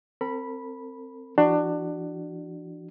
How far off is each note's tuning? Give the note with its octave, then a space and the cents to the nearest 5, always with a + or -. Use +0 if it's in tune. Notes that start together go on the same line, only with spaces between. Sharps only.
C4 +0 A#4 -45 B5 -10
E3 +45 D4 +25 F#4 +30